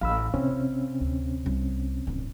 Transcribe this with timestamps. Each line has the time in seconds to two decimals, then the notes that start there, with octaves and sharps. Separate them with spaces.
0.01 A1 F5 B5 E6
0.34 C3 C4 C#4 E4
1.01 D2
1.46 C2
2.07 D1 G2